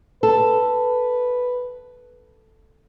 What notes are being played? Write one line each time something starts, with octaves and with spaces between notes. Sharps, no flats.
A4 B4